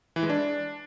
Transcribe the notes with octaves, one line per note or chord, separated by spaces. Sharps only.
E3
G#3
D4